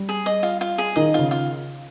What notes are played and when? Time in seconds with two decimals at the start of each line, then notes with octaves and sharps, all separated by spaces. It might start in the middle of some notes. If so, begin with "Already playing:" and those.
Already playing: G3
0.09 G#4
0.26 D#5
0.43 F4
0.61 F4
0.78 G#4
0.96 D#3 D#5
1.14 C#3 F4
1.31 F4